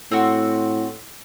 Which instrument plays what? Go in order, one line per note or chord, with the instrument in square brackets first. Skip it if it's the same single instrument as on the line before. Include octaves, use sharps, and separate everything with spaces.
[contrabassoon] A2 [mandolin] C4 F#4